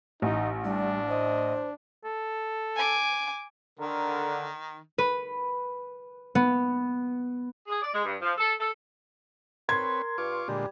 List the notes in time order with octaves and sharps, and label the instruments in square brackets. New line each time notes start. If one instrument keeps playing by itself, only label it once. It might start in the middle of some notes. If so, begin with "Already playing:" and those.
[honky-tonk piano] A1 [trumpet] D#4
[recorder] G3 [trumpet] D4
[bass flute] C5 [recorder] D#5
[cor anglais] A4
[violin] G#5 D6
[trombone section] D3 [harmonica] D#3 [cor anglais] A#4
[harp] B4
B3
[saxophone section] G#4
D5
G#3
G2
F3
A4
A4
[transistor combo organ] C4 B4 C#5 [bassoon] A#4 [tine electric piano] C6 [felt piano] G#6
[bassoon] G2 [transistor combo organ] F4 C#6 D6
[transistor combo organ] A#2 D3 G#3 [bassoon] G3